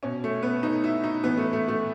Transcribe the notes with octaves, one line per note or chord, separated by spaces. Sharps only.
B2 C#4
A3
B3
D#4
E4
D#4
A2 E3 B3
A3
A3
A3